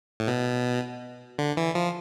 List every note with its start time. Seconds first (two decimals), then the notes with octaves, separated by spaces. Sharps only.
0.20 A2
0.27 B2
1.39 D3
1.57 E3
1.75 F3